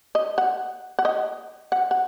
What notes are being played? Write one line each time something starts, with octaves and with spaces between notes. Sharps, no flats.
D#5
F#5
F#5
D#5
F#5
F#5